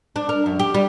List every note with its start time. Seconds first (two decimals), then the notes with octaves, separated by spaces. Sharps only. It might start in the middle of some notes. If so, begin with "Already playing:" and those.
0.16 D4
0.29 A#4
0.46 F#2
0.60 G4
0.74 G3